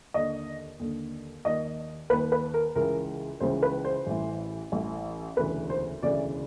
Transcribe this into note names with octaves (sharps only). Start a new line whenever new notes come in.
D#2 D3 D#5
D#2 D3
D#2 D#3 D#5
D#2 D#3 B4
B4
A#4
C#2 C#3 E3 A#4
C#2 C#3 E3 C5
B4
C5
A1 A2 E3
A1 A2 E3
E1 D2 C#3 E3 B4
C5
E1 D2 C#3 E3 D5